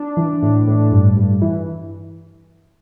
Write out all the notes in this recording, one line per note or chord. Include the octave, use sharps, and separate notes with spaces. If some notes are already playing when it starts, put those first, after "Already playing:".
Already playing: D4
E3
A2
A2
G2
G2
E3